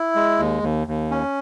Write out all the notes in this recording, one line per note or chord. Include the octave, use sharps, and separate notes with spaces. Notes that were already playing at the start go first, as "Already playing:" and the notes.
Already playing: E4
G#3
D#2
D#2
D#2
C#4